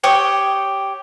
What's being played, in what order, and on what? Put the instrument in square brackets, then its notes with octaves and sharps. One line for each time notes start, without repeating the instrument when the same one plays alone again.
[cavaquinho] G4 C#5 G5 D#6